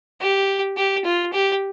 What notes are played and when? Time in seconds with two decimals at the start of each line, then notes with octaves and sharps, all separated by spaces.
0.21 G4
0.77 G4
1.05 F4
1.33 G4